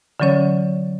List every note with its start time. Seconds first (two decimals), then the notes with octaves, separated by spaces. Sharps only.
0.20 D3 E3 F#3 C#4 C#5